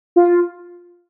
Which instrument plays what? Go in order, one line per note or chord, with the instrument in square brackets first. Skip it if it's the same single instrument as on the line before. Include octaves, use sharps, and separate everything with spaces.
[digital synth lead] F4